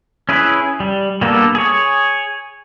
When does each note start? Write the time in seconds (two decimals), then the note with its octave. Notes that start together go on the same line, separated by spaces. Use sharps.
0.29 C#4 E4 G#4 B4
0.80 G3
1.21 G3 A#3 B3 D4 A4
1.55 G#4 C#5